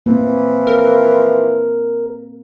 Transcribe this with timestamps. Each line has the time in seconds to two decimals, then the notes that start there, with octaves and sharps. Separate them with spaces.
0.06 E3 F3 A#3 C4
0.67 A#4